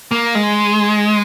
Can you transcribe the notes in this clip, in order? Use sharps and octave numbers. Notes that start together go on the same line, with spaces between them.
A#3
G#3